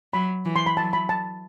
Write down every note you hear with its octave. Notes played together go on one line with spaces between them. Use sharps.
F#3 B5
E3
C6
B5
F#3 A5
B5
A5